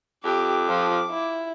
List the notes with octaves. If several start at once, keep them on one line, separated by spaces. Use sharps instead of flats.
F2 G4 D6
F3
E4